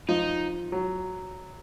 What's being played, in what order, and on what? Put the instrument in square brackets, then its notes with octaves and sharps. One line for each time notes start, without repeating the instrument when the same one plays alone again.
[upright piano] F3 [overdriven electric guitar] D#4
[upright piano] F#3